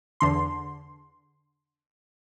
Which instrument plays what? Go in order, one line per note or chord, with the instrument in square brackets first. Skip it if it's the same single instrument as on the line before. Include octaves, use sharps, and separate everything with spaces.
[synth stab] E2 D3 C6